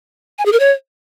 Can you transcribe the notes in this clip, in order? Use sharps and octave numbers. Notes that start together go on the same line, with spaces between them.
G#5
G#4
A#4
C#5